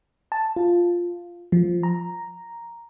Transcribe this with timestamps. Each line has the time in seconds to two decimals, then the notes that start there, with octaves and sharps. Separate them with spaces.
0.32 A5
0.56 F4
1.52 F3
1.83 A#5